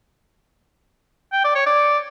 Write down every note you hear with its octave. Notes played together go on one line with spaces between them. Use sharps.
G5
D5
C#5
D5